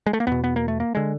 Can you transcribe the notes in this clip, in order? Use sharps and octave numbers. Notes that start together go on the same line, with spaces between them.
G#3
A3
A#3
E2 B2 B3
B3
A#3
A3
A#3
D3 G#3